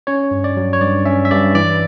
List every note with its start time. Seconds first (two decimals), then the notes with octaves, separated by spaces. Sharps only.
0.07 C#4 C#5
0.31 G2
0.44 D5
0.57 F#3
0.73 C#5
0.81 G2 D5
1.05 C#4 E5
1.25 E5
1.31 G2 D5
1.54 E3 D5